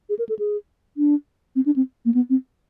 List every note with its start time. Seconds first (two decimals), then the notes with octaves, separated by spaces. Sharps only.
0.09 G#4
0.19 A#4
0.29 A4
0.39 G#4
0.97 D4
1.55 C4
1.65 D4
1.76 C4
2.05 A#3
2.14 B3
2.30 C4